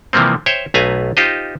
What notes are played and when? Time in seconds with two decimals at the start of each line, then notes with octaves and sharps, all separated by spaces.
0.13 C3 E3 F3 G3 A#3 C4
0.46 C5 C#5 E5 G5
0.74 B1 A3 B4 F5 G#5 A#5
1.17 D#4 F4 G4 C5 D#5